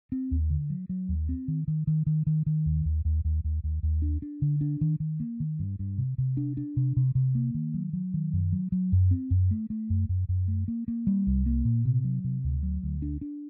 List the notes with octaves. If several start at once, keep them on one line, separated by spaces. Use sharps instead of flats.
C4
D#2
D3
F#3
F#3
D#2
C4
D#3
D#3
D#3
D#3
D#3
D#3
D#2
D#2
D#2
D#2
D#2
D#2
D#2
D4
D4
D3
D4
D#3
D#3
A#3
D#3
G2
G2
C3
C3
D4
D4
C3
C3
C3
A#3
D#3
F#3
F#3
D#3
F#2
F#3
F#3
F#2
C4
F#2
A3
A3
F#2
F#2
F#2
A3
A#3
A#3
G3
C2
A#3
A#2
C3
F#3
C3
D2
F#3
D2
D4
D4